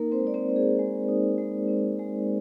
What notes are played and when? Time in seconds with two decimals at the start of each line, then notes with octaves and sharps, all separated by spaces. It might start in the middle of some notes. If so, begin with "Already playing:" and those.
Already playing: A#3 D#4 A#4
0.12 C4 C5
0.19 G#3
0.27 D5
0.34 C4 C5
0.49 C4
0.56 G#4
0.79 G#3
1.08 D#4
1.38 G#3
1.68 C4
1.99 G#3